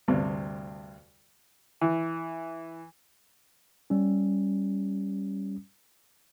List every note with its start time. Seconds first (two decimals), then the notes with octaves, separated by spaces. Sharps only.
0.08 D2 G2 C3
1.81 E3
3.90 G3 C#4